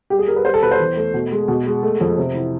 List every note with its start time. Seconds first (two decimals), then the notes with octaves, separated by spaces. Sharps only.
0.10 G3 G4
0.19 G#4
0.28 G3 A#4
0.36 B4
0.45 G3 C5
0.54 A4
0.62 B2 B4
0.71 C5
0.80 E2
0.97 A3
1.14 B2
1.32 G#3
1.48 B2
1.66 G#3
1.83 A3
2.01 F2
2.18 C3
2.34 E3